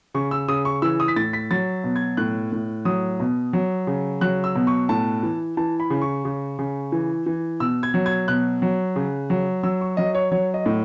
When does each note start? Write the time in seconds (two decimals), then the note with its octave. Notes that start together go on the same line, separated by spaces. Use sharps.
0.14 C#3 C#6
0.31 E6
0.48 C#3 D#6
0.65 C#6
0.82 E3 E6
1.00 D#6
1.08 B6
1.16 A2 A6
1.33 B6
1.51 F#3 A6
1.84 B2
1.96 G#6
2.17 A2 F#6
2.52 A2
2.85 F#3 D#6
3.20 B2
3.53 F#3
3.87 C#3
4.21 F#3 F#6
4.44 E6
4.55 B2
4.67 C#6
4.89 A2 A5
5.23 E3
5.57 E3 A5
5.80 B5
5.90 C#3
6.02 C#6
6.25 C#3
6.59 C#3
6.92 E3
7.26 E3
7.60 B2 E6
7.83 G#6
7.94 F#3
8.06 G#6
8.28 B2 F#6
8.62 F#3
8.96 C#3
9.30 F#3
9.63 F#3 E6
9.81 C#6
9.97 F#3 D#5
10.15 C#5
10.32 F#3 C#5
10.54 D#5
10.66 A2